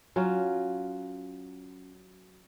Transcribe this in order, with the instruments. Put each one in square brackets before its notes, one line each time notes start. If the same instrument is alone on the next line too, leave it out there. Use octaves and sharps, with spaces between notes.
[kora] F#3 C#4 F4